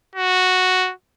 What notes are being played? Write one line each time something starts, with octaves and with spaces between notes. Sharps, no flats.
F#4